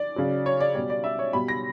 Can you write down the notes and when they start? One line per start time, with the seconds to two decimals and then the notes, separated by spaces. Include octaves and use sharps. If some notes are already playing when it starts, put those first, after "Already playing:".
Already playing: D5
0.16 C#3 F#3
0.46 C#5
0.60 D5
0.75 B2 G3 D5
0.90 D5
1.04 E5
1.19 C#5
1.33 B2 G3 B5
1.48 A#6